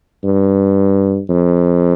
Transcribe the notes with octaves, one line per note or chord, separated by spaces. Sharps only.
G2
F2